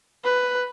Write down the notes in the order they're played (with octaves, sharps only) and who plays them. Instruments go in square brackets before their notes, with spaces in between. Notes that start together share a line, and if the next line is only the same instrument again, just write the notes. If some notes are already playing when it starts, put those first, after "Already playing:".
[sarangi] B4